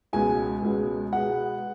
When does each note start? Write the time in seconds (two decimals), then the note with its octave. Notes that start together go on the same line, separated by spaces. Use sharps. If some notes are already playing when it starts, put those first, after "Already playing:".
0.13 C#2 B2 G#3 B3 G#5
0.63 C#2 B2 G#3 B3
1.13 B2 G#3 B3 F#5